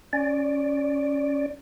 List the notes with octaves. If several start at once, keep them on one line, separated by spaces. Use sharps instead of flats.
C#4 D5